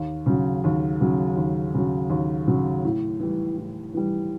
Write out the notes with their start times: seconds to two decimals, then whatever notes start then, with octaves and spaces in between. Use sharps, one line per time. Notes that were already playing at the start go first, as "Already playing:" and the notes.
Already playing: D#2
0.26 C#3 F#3
0.64 D#2
1.01 C#3 F#3
1.36 D#2
1.74 C#3 F#3
2.10 D#2
2.47 C#3 F#3
2.84 A2
3.20 E3 G3
3.57 A2
3.94 E3 G3